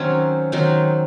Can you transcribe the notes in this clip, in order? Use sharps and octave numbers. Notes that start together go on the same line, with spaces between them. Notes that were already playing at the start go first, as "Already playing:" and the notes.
Already playing: D#3 F#3 C4 C#4
D#3 F#3 C4